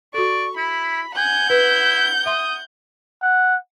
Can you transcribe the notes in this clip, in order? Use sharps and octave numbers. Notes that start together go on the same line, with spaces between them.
F#4 A4 D5 C#6
E4 B5
F#5 G#5 G6
E4 B4
E5 C6 D#6
F#5